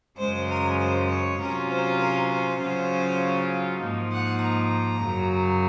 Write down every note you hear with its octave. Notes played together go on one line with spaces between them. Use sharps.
F#2 C#3 G#3 C5
A#4
C5
C#5
C3 F#3 C#4 F4 A#4
C5
A#4
C5
C#3 F#3 C#4 F4
G#2 F3 A#3 D#4
F#5
A#5
F#2 C#3 F#3